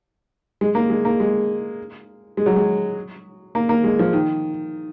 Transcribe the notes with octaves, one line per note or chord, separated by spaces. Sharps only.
G#3
A#3
G#3
A#3
G#3
G#3
F#3
G#3
A#3
A#3
G#3
F3
D#3